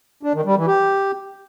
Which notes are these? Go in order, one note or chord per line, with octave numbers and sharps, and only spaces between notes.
D4
D#3
G3
E3
G4